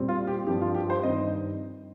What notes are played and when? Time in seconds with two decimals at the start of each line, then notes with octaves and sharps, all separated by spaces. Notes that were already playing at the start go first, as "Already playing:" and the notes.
Already playing: A#2 G3 C4
0.09 F4
0.27 G4
0.47 G2 F3 C4 G4
0.61 F4
0.74 G4
0.90 C5
1.03 G2 D#3 C4 D#5